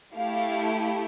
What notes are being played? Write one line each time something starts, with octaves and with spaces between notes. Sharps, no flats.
A3 E4 G4 F5